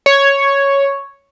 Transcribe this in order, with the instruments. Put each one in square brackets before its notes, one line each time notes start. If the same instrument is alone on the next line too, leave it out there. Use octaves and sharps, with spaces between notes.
[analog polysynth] C#5